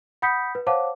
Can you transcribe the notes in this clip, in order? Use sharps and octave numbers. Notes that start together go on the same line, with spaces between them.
F#5 B5 D#6 G6 B6 C#7
B4
C5 C#5 F5 F#5 A5 D6